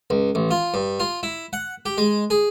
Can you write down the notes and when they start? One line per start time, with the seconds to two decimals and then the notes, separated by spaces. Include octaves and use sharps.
0.10 C#2
0.35 A1
0.51 F4
0.74 G2
1.00 F4
1.23 E4
1.53 F#5
1.86 G4
1.98 G#3
2.30 G#4